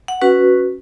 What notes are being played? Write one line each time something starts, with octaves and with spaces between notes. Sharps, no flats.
F#5
C#4 F#4 B4